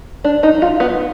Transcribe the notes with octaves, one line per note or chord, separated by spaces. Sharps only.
D4
D#4
F4
B3